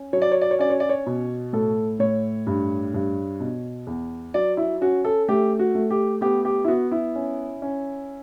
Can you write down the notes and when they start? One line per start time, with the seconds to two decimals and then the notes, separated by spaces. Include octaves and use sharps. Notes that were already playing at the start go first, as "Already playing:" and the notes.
Already playing: C#4
0.13 F#3 C#5
0.22 D5
0.32 C#5
0.41 D5
0.51 C#5
0.59 C#4 D5
0.70 C#5
0.80 D5
0.89 C#5
1.06 B2
1.53 A2 A4
1.99 A2 C#5
2.47 G2
2.94 G2
3.40 B2
3.87 E2
4.34 F#3 D5
4.57 E4
4.81 C#4 F#4
5.05 A4
5.28 A3 G4
5.59 F#4
5.75 A3
5.91 G4
6.21 B3 G4
6.45 G4
6.64 E4
6.68 B3 F#4
6.91 E4
7.15 C#4
7.62 C#4